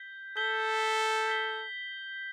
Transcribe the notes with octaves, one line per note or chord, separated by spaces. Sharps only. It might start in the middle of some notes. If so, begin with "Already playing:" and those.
Already playing: G6 B6 G7
A4 G6 B6 G7
G6 B6 G7